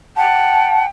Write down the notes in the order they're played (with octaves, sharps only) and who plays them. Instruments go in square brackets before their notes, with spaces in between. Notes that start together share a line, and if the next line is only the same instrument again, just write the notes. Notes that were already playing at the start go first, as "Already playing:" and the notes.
[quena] F#5 [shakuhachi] G5 [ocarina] A5